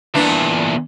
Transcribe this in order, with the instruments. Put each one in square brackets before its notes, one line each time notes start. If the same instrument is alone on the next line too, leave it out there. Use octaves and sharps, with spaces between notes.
[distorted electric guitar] E2 A#2 [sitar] E3 D4